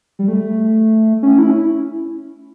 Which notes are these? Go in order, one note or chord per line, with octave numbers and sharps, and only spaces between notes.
G3
A3
C#4
E4